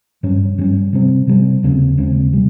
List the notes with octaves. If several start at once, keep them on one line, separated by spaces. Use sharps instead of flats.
G2 G3 C#4
G2 G3 C#4
C3 G3 C4
C3 G3 C4
D#2 C#3 G#3 C4
D#2 C#3 G#3 C4
C3 G3